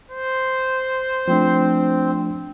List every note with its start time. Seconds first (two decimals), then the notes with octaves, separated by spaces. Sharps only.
0.10 C5
1.28 F3 A3 C4 D4